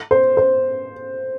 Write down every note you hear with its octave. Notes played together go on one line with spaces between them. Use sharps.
C5
C5